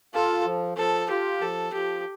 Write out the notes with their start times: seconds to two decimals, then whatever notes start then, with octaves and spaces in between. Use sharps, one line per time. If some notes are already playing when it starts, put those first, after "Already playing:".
0.14 F4 A4
0.46 F3
0.77 F3 A4
1.10 F4 G4
1.41 F3 A4
1.73 F3 G4